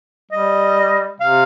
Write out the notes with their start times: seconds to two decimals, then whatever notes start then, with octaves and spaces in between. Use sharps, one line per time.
0.31 G3 D#5
1.20 C3 F5